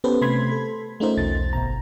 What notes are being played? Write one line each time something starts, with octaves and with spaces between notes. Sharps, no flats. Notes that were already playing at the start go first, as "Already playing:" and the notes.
B3 C#4 G4 A4 B4 C5
C3 A3 B5 C6 G#6 B6
A4
A3 C#4 D#4 F4 A#4 C5
B1 E2 A6
G1 B2 A#5